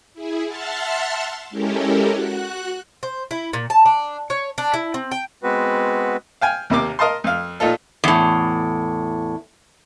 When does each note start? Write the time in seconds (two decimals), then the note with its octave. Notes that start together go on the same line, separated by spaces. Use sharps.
0.14 E4 G#4
0.46 E5 F#5 A5 C6 F6 A6
1.50 G#3 C#4 E4 G4 A4 A#4
2.10 F#4 F#6
3.03 C5
3.31 E4
3.53 A#2
3.70 A5
3.85 D4
4.30 C#5
4.58 D4
4.74 E4
4.94 C4
5.11 G5
5.43 G#3 B3 C4 F#4 B4
6.41 F5 G5 G#5
6.70 D#2 C3 A#3 D6
6.99 A#4 D#5 F5 A5 C6
7.24 F2 F5
7.60 A#2 D#4 F4 A4
8.04 E2 A2